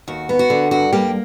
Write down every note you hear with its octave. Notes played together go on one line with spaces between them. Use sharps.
D#2 F#4
B3
F#4
D3
G2 F#4
G3 A#3 G4